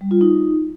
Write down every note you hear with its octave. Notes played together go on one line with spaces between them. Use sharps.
G3
F4
D#4